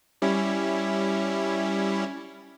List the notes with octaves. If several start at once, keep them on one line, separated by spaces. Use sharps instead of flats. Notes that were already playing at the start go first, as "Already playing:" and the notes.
G3 C#4 E4